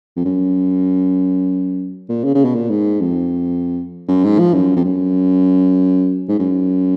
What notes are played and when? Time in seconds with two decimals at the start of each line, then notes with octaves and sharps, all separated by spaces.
0.16 F2
0.25 F#2
2.09 A#2
2.24 C#3
2.35 C#3
2.44 B2
2.55 A#2
2.70 G#2
3.01 F2
4.08 F#2
4.24 G#2
4.39 F3
4.54 F#2
4.76 F2
4.85 F#2
6.28 G#2
6.39 F#2